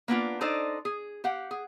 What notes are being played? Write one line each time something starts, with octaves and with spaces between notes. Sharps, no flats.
A#3 B3 D4 F4
D4 D#4 A4 C5 D5 D#5
G#4
G4 F5 F#5
G#4